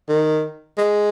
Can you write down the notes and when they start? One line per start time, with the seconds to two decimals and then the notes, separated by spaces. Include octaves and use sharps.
0.09 D#3
0.77 G#3